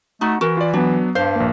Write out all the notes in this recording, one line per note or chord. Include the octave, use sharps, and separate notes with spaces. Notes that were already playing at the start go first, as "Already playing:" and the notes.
A3 D#4 F#4
E3 F#4 A#4
F4 D5
F#3 B3 D4
G2 C5 F5
A#1 A#3